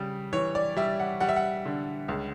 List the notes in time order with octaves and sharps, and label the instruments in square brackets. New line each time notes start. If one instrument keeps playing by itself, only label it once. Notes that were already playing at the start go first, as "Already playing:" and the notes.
Already playing: [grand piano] C#3 G3
E3 C#5
D5
G3 E5
F#5
G3 F#5
E5
F#5
D3
C#2